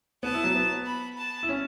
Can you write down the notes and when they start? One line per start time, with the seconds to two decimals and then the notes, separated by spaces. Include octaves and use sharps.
0.23 B3 A5
0.34 E4
0.44 F#3
0.55 B3
0.86 B5
1.18 A5
1.43 E4
1.49 C#4